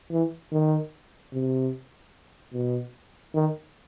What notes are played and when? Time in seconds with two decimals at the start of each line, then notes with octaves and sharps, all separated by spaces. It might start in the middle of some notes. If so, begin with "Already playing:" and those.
0.10 E3
0.51 D#3
1.32 C3
2.53 B2
3.34 D#3